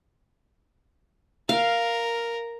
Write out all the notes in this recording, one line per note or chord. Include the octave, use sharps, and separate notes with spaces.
A#4 F5